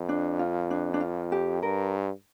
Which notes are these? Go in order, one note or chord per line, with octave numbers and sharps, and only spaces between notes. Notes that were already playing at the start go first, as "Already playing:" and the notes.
Already playing: F2
D4
F4
D4
D4
F4
G4
G2 A#4